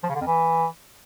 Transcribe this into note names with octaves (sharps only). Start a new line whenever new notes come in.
F3
C#3
D3
F2
E3